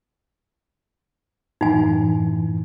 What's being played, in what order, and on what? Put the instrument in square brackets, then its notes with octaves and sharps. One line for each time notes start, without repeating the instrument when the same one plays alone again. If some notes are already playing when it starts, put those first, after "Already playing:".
[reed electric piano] F#2 A2 E3 [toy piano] D#4 G#5